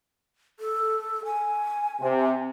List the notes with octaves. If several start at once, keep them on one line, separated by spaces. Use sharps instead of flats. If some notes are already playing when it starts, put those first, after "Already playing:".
A4
G#5
C3